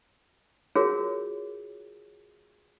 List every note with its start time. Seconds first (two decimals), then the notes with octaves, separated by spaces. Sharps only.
0.75 F4 F#4 G#4 A#4 C#5